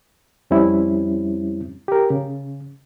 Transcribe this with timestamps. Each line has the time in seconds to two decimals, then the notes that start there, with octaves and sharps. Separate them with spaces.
0.50 F2 G3 C4 C#4 E4
1.88 G4 A#4
2.10 C#3